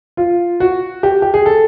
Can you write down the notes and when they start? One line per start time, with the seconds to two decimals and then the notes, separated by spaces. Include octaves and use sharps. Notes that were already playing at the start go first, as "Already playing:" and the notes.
0.17 F4
0.60 F#4
1.03 G4
1.22 G4
1.34 G#4
1.46 A4